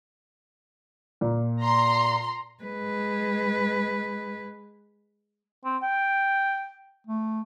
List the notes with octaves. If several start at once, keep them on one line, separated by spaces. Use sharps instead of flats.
A#2
A#5 C6
G#3 B4
C4
G5
A3